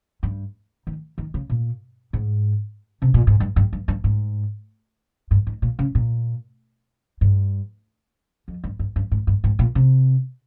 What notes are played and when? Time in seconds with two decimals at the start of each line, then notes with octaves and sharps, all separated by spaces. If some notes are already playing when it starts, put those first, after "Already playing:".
0.23 G2
0.87 D#3
1.18 D#3
1.34 C#3
1.50 A#2
2.13 G#2
3.02 C3
3.14 A#2
3.27 G#2
3.40 G2
3.56 G2
3.73 G2
3.88 G2
4.04 G#2
5.31 G2
5.47 G#2
5.62 A#2
5.79 C#3
5.95 A#2
7.21 G2
8.48 F2
8.64 G2
8.79 G2
8.96 G2
9.11 G#2
9.27 G2
9.44 G#2
9.59 A#2
9.75 C3